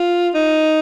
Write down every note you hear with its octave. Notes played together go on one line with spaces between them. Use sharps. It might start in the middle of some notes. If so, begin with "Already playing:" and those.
Already playing: F4
D#4